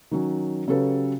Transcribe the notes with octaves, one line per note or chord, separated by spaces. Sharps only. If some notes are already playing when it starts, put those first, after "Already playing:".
D#3 F#3 C#4
C#3 F#3 C#4 G4 A4 B4